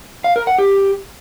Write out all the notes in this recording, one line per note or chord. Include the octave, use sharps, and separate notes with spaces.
F5
A#4
F#5
G4